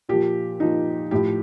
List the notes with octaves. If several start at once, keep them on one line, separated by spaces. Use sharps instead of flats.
A#2 F3 G4
A#2 F3 D#4
A2 F3 G4